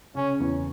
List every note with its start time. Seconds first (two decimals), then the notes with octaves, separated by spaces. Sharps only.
0.15 C#3 C#4
0.40 E2